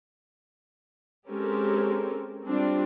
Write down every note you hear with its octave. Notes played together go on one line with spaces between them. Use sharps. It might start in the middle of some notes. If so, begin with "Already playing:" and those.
G#3 C4 C#4 G4 A4 A#4
G3 C4 D4 F4